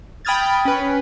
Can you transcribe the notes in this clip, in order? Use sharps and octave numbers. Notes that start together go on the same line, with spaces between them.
G5 B5 D#6 F6 G#6 A6
C#4 B4